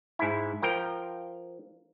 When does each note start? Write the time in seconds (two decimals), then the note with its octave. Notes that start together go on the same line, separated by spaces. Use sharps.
0.19 G#2 E4
0.62 F3 A#4 G5